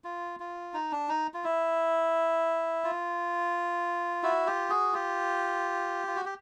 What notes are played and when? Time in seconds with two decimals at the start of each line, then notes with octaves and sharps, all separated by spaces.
0.04 F4
0.40 F4
0.74 D#4
0.92 D4
1.09 D#4
1.34 F4
1.44 E4
2.84 F4
4.23 E4 F#4
4.47 F4 G4
4.70 F#4 G#4
4.93 F4 G4
6.07 F4
6.16 F#4
6.25 G4